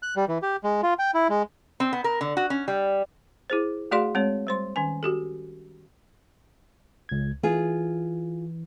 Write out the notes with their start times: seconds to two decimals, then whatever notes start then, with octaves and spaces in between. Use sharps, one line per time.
0.03 F#6
0.17 G3
0.28 E3
0.43 G4
0.64 G#3
0.83 F4
0.99 G5
1.14 E4
1.30 G#3
1.80 C4
1.93 B3
2.04 A#4
2.21 D3
2.37 F#4
2.50 C#4
2.68 G3
3.50 E4 G#4 C5
3.91 A3 F#4 G#4 D5 F5 C6
4.15 G#3 C4 C#5
4.47 G3 C5 C6
4.76 D#3 C#4 G#5
5.03 F#4 G4 A4
7.09 C#2 G#6
7.43 E3 F4 G#4